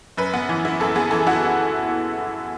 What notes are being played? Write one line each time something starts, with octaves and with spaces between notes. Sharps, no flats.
F#2 B4
B3
E3
E4
F#2 A4
B3 G#4
E3 A4
E4 F#4